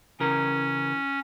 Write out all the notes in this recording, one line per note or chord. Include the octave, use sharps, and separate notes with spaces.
C#3 E3 C#4 A#4